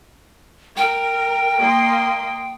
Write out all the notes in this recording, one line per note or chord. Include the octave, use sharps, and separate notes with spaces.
A#4 G5
A#3 D#5 C6